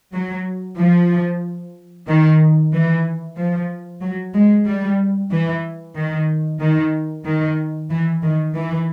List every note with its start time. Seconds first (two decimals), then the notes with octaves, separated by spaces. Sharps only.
0.13 F#3
0.77 F3
2.08 D#3
2.72 E3
3.37 F3
4.01 F#3
4.34 G#3
4.66 G3
5.31 E3
5.95 D#3
6.60 D#3
7.25 D#3
7.90 E3
8.23 D#3
8.55 E3